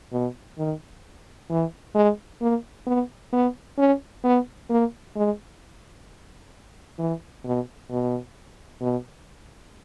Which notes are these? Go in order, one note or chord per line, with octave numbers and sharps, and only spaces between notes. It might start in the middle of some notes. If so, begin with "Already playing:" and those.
B2
D#3
E3
G#3
A#3
B3
B3
C#4
B3
A#3
G#3
E3
B2
B2
B2